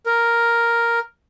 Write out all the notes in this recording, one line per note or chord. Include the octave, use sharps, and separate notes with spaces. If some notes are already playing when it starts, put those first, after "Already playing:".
A#4